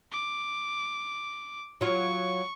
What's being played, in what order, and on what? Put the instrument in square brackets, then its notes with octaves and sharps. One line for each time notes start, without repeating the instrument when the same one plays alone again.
[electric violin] D6
[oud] F#3 F4 [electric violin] C#6